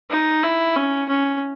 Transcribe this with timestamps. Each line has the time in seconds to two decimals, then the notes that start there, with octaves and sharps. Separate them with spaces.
0.10 D#4
0.43 E4
0.76 C#4
1.09 C#4